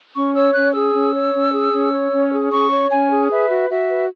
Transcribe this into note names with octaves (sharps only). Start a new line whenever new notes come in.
C#4 C#6
C#5 E6
C#4 F#6
G#4 E6
C#4
C#5
C#4
G#4
C#4
C#5
C#4
G#4
C#4 C#6
C#5
C#4 G#5
G#4
B4 E5
F#4
F#4 E5
B4